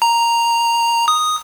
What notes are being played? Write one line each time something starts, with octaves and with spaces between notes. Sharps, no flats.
A#5
D#6